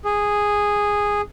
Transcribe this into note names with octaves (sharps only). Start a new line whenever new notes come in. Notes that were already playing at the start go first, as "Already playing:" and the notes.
G#4